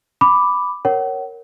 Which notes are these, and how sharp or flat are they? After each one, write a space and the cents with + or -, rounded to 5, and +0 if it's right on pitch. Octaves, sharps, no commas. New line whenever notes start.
B5 +0 D6 +0
A#4 +0 C#5 -5 F#5 +35